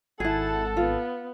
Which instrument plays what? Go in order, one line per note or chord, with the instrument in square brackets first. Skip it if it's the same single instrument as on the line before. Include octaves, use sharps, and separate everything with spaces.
[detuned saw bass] G#1 [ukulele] E4 G#4 [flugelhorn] A4 [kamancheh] F#5 A5
[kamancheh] B3 [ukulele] F4